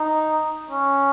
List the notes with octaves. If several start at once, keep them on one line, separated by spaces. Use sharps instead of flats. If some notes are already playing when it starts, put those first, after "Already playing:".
Already playing: D#4
C#4